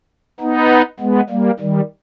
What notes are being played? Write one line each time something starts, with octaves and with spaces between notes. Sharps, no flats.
B3 D#4
G#3 B3
G3 A#3
D#3 G3